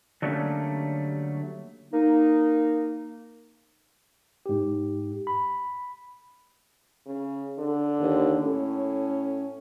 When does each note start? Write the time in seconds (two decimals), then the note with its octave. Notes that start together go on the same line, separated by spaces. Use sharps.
0.22 D3 F#3 G3 A3 A#3 C#4
1.93 A#3 D#4
4.46 G#2 G4
5.27 B5
7.06 C#3
7.59 D3
7.99 D#2
8.41 A2 C#4